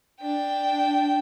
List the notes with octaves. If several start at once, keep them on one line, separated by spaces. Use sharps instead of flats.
D4 G5